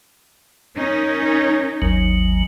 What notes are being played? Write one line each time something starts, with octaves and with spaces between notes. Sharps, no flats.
C#4 D#4 A#4
G#1 D#2 F#3